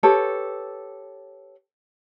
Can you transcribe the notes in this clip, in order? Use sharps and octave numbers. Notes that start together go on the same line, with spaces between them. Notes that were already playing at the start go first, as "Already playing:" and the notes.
G4 A4 B4 C#5